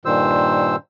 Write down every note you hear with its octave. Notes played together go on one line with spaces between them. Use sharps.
G2 A#2 D#3 C5 E6